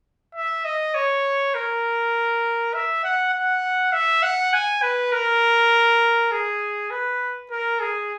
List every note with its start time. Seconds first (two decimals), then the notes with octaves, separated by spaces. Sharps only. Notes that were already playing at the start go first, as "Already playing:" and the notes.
0.35 E5
0.65 D#5
0.94 C#5
1.55 A#4
2.74 E5
3.04 F#5
3.33 F#5
3.93 E5
4.23 F#5
4.53 G#5
4.82 B4
5.12 A#4
6.32 G#4
6.90 B4
7.51 A#4
7.81 G#4